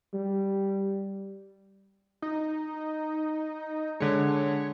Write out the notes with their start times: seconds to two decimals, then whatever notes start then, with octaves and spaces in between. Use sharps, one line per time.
0.14 G3
2.22 D#4
4.00 D3 G#3 C#5